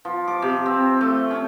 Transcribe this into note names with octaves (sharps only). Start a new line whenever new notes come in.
F3
D6
C3
C4
A3
C#4